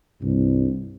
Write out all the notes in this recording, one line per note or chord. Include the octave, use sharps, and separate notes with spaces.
C2 G2